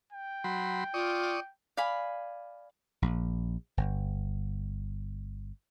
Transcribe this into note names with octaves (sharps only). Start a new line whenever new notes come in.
G5
F#3 B5 C6
F4 D5 C#6 D#6
D5 F5 G#5 B5
A#1
G1